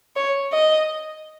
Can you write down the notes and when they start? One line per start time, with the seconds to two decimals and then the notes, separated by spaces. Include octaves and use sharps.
0.16 C#5
0.53 D#5